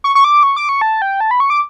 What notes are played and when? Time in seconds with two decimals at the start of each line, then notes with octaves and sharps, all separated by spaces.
0.04 C#6
0.15 C#6
0.24 D6
0.43 C#6
0.56 D6
0.69 C#6
0.81 A5
1.02 G5
1.20 A5
1.31 B5
1.40 C#6
1.50 D6